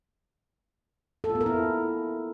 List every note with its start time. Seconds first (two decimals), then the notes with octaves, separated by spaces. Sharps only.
1.24 A4
1.29 F4
1.35 B3
1.41 A#4
1.46 E4